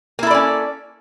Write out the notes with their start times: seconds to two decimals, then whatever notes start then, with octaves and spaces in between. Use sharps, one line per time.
0.19 A#3
0.23 E4
0.27 A4
0.31 D5
0.35 C#4